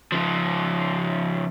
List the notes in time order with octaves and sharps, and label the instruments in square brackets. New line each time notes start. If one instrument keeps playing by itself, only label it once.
[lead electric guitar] C#3 F3